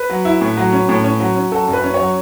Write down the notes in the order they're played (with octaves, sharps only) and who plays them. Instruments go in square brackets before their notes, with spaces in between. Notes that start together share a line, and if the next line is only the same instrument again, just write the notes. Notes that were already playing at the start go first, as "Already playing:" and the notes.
Already playing: [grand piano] B4
F#3
E4
A2
F#3
C#4
A2
C#4
F#3
C#4
F#3 A4
F#2
B4
C#4
F#3 C#5